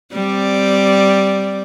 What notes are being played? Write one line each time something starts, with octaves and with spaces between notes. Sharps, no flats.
G3 C4 D5